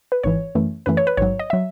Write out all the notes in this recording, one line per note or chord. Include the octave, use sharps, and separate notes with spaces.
B4
G#1 G#2 E3 C#5
F#2 E3 A3
F#2 E3 A3 B4
C#5
B4
A1 G#2 F#3 C#5
D#5
F#3 E5